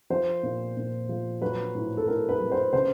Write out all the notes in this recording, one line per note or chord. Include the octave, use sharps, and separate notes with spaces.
F3 C5
A#2
A#2
F3
F#3 B4
A2
A4
A2 A#4
B4
F#3
C5
C#3 C5